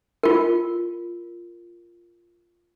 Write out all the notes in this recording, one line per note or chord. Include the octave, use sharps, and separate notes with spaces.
F4 A#4